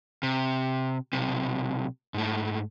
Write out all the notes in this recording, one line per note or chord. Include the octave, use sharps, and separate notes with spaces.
C3
B1 C3
G#2 A3